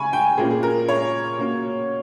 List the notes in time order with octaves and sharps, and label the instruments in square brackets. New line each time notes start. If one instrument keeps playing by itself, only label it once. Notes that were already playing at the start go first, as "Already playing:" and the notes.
Already playing: [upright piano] C#3 G#5 B5 C#6
G5
A#2 A#3 C#4 G#4
G#4
A#4
C#5
B2 A#3 C#4